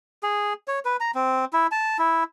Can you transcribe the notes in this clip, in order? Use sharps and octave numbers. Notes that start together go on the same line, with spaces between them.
G#4
C#5
B4
A#5
C4
E4
A5
E4